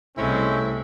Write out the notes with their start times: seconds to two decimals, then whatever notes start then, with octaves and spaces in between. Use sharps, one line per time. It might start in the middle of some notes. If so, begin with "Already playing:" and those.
0.17 C2 G#3 A3 C4 C#4 E4